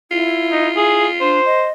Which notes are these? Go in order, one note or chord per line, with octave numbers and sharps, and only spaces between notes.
E4 F4
D#4
G#4
D4 C5
D#5